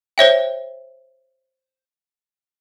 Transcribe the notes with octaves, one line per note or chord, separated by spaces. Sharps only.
C5 C#5 E5 G5